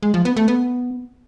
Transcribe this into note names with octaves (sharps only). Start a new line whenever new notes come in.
G#3
F3
B3
A3
B3